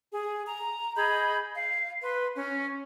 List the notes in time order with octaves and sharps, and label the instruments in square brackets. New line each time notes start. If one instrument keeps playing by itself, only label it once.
[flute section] G#4
A#5
G#4 D#5 B5 G6
F5
B4 C6
C#4